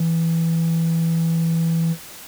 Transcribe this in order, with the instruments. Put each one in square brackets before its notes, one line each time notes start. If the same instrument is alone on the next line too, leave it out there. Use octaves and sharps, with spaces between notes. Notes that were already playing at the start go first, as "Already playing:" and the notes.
Already playing: [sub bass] E3